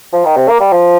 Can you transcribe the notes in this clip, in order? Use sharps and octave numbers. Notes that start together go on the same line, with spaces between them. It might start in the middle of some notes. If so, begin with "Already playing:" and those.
F3
D#3
C3
A#3
G3
F3